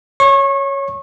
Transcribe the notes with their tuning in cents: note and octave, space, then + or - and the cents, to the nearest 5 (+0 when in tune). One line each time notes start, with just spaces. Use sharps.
C#5 +0 C#6 -30